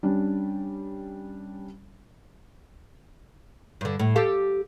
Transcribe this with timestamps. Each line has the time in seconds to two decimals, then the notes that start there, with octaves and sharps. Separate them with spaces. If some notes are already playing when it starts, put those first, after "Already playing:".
0.03 G3 C#4 D4
3.81 G2 D3
4.00 A2
4.16 G4 A4 F5